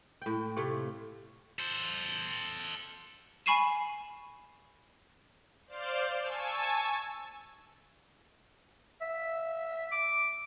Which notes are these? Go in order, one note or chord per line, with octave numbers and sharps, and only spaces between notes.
A2 G5
C3 A3 F4 C#5
A4 C5
G#5 B5 C#6 C7 D#7 E7
C5 D5 F5 D6 F6 G6
G#5 A5 C#6 E6
E5
D6